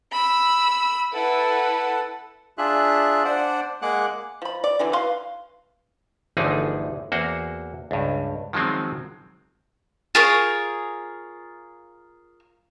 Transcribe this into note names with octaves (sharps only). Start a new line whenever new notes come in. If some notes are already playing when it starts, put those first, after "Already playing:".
B5 E6
E4 A4 B4 F#5 A5
D4 F4 G#4 E5 F#6
D4 C5 D5 F#5
G#3 A#3 G#4 F#5 D6 F#6
F3 B5
D5
D3 E3 F#3
B4 F5 C6
G1 D2 E3 F3 D#4 G#4
E2 A#3 F#4 C5
C#2 G2
D#3 F3 F#3 G#3 C4
F4 G#4 A#4 C#5